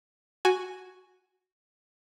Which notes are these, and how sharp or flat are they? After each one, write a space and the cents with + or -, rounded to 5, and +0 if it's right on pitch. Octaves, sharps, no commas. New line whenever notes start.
F#4 +0 G#5 +0